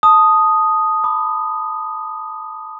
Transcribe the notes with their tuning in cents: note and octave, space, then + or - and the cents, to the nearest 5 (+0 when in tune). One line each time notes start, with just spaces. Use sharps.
A5 +0 D#6 +0
B5 +0 D6 +30